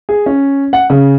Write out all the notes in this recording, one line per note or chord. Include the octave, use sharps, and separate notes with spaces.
G#4
C#4
F#5
C#3